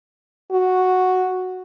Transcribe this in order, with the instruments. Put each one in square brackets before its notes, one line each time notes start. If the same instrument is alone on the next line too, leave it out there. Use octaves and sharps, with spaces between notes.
[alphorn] F#4